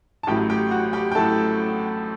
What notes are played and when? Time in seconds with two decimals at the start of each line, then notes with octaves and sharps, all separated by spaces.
0.23 A5
0.27 A1 A2 F#3 A3 G4 G5
0.50 G4 G5
0.71 F#4 F#5
0.93 G4 G5
1.12 G5
1.15 A2 F#3 A3 A4 A5